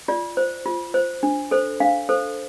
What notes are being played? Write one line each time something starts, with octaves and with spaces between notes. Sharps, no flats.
F4 D5
C5
F4
C5
D4
A4 C5
D4 F5
A4 C5